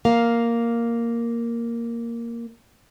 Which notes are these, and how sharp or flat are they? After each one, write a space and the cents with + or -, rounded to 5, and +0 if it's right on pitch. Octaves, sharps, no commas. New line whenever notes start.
A#3 +0 F5 +0